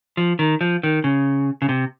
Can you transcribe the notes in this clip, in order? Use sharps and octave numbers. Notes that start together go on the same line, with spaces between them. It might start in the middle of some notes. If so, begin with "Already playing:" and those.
F3
D#3
F3
D#3
C#3
C#3
C3